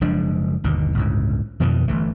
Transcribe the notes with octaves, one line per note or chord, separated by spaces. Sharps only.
F#1 F3 G#3 D4
G1 D#2 B2
G1 C#2 A2
F2 B2 D#3 E3
G1 E3 A3